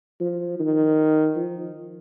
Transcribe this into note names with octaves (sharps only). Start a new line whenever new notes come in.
F3
D#3
F3